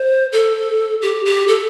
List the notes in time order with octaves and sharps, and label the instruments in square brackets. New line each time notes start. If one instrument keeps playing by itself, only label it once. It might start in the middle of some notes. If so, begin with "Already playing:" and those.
Already playing: [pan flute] C5
A4
G4
G4
A4